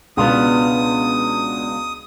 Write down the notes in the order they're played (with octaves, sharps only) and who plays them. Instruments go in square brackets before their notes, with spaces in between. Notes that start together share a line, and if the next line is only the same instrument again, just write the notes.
[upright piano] C#2 B2 [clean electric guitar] B3 D4 F4 [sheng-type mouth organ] D#6